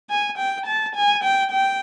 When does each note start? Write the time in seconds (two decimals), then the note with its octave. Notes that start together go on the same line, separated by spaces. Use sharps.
0.10 G#5
0.38 G5
0.66 A5
0.96 G#5
1.24 G5
1.51 G5